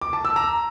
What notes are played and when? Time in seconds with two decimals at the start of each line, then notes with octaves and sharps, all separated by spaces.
0.01 D6
0.13 A5
0.25 E6
0.36 A#5